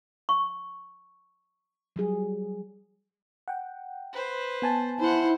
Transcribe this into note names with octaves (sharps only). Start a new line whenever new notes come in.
C#6
F#3 G3 G#4
F#5 G5
B4 C5
B3 G#5 A5
E4 C5 F#5